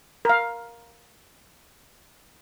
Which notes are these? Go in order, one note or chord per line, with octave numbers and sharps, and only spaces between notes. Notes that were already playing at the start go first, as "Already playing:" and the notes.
A#4 F5